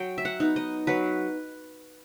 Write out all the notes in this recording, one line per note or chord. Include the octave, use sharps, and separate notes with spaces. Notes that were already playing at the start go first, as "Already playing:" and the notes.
Already playing: F#3 G5
E5
F#5
B3 D#4
D#5
F#3 B4